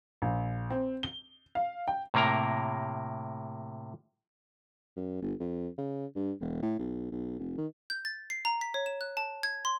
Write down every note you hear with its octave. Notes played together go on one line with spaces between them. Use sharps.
A#1
C4
G7
F5
G5
A2 C3 A#3 A#4 A#5
F#2
G1
F2
C#3
G2
E1
A2
B1
B1
F1
D#3
G6
A6
C7
A#5
B6
C#5
E7
F#6
A5
G#6
C6